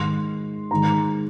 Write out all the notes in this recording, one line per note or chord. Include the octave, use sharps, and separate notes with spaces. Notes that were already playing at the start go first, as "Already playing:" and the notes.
Already playing: G#2 D#3 C6
G#2 D#3 A#5